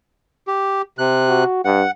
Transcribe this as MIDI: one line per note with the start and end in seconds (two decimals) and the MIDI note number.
0.48 0.82 67
0.99 1.44 48
0.99 1.44 90
1.29 1.63 66
1.65 1.84 43
1.65 1.91 78